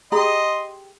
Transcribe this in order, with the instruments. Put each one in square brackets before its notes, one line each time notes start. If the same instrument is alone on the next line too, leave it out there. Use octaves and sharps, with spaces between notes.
[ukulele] G4 G#4 A#5 [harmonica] D#5 C6